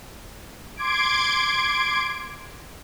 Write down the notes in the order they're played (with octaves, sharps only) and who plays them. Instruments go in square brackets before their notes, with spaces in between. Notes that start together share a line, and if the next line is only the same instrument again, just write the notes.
[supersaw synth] C6 D6 G#6 D7